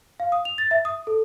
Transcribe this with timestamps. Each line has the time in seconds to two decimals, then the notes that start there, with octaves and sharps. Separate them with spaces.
0.20 F5
0.32 D#6
0.45 F7
0.58 A6
0.71 E5
0.85 D#6
1.07 A4